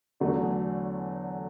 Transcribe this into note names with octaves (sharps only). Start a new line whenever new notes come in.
E2 D3 F#3 A3